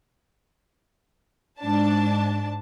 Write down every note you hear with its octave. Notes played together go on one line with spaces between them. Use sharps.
G#2 D4 A5